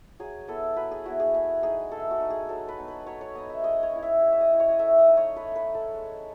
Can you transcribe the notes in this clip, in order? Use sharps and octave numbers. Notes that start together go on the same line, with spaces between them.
F#3 G#4
B3 E4 A4
F#3 B4
G#4
B3 E4 F#4
G#4
A3 G#4
D#4 G#4
A3 A4
F#4
D#4
G#4
F#3 A4
B4
B3 D#4
B4
F#3 C#5
C#5
B3 D#4 D#5
E5
G#3 D#5
C#5
C#4 E4
E5
G#3
E5
D#5
C#4 E4
C#5
D#5
A3 E5
D#5
D#4
C#5
A3 B4
B4
D#4
A4
G#3